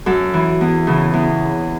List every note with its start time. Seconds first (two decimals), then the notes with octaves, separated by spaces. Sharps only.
0.06 F#2 A4
0.34 E3
0.61 E2
0.87 C#3 E3
1.14 E2